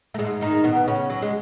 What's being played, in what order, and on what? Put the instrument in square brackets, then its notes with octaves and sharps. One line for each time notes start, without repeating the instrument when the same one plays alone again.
[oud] A3
G#2 G#3
D#3 D#4
B2 B3
C#3 C#4
F#3
G#3